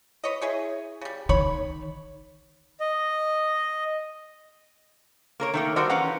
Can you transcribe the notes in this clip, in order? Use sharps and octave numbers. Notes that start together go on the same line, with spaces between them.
B4 C#5 D#5
E4 G#4 C#5
C#3 G3
D#3 C#5 B5
D#5
A#3 A#4 C#5
D#3 A3 A#3
G3 F#4 A4 A#4 C5 D5
E3 C#4 B4 F5 F#5 A#5